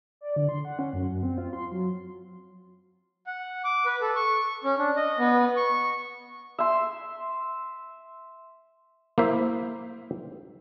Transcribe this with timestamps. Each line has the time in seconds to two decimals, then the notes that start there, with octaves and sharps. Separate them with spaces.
0.21 D5
0.36 D3
0.49 C6
0.65 F#5
0.79 C#4
0.93 F#2
1.11 F#2
1.23 C4
1.38 F4
1.53 C6
1.72 F#3
3.27 F#5
3.64 D6
3.86 B4
4.01 A4
4.16 C#6
4.64 C#4
4.78 D4
4.97 D#5
5.18 B3
5.56 C#6
6.58 E5 C6
9.18 A#3 E4 C5 E5